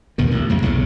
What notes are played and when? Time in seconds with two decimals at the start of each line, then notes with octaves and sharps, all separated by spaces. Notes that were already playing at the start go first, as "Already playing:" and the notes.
0.18 E2 G2 B2 D#3
0.31 A1
0.49 F#2 C#3 A#3
0.62 B1 E2 A2 C#3